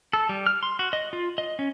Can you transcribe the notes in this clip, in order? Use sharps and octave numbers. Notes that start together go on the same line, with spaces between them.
A4
G3
F6
C6
F#4
D#5
F4
D#5
C#4